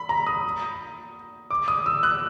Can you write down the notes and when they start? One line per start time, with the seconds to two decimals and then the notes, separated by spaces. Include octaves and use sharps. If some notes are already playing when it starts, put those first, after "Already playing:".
Already playing: B5
0.09 A#5
0.27 D#6
1.51 D6
1.68 D#6
1.86 E6
2.03 F#6